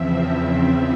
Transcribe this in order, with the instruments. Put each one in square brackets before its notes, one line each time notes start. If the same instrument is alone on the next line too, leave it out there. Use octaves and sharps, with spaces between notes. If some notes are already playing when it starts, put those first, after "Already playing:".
Already playing: [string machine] E2 C#3 F3 C4 E5